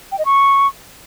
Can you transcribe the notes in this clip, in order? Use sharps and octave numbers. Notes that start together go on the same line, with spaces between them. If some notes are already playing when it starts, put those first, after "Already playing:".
G5
D#5
C#6